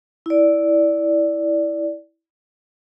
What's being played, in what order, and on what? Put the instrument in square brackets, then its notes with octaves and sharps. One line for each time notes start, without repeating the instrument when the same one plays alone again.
[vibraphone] E4 D5